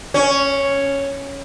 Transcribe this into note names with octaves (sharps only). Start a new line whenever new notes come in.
C#4